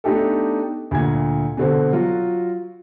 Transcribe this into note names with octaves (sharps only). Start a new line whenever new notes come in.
A3 B3 D4 D#4 G4 A4
D2 A#2 G#6
B2 D3 C4
F#3 F4 F#4